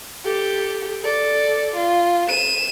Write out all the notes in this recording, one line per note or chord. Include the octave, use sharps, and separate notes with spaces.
G4 A4
A4 D5
F4
D#7 E7